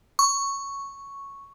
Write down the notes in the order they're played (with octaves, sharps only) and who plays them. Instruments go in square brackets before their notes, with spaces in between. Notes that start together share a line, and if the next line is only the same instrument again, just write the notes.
[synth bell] C#6